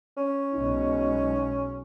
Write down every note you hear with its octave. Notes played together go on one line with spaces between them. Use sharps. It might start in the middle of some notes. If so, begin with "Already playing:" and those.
C#4
B1 B2 G#3 D#4